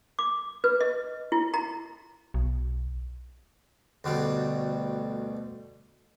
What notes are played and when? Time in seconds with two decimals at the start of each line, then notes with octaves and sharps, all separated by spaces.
0.19 D6
0.64 B4
0.81 D#5
1.32 E4
1.54 A#5
2.34 B1
4.04 D2 B2 G3